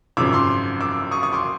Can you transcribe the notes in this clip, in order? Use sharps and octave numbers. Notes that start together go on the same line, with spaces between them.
G#1 F#2 C#3 F3 D6 E6
C6 D6
D6 E6
C#6 D#6
C#6 D#6
C6 D6